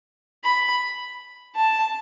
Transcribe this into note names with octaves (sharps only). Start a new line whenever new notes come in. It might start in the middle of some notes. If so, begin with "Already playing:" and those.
B5
A5